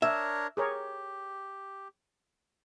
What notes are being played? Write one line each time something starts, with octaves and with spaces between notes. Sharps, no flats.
D4 A#4 C#5 E5
G4 G#4 A#4 C#5